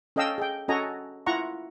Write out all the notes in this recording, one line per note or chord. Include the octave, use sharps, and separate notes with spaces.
C#4 A4 D#5 F5 G5 E6
G#4 D#5 G5
C#4 F#4 A4 D#5 G#5 A#5
E4 F4 F#5 A#5 C#6